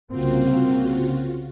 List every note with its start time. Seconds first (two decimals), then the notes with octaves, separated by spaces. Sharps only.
0.11 C2 C#3 A#3 C4 F4 F#4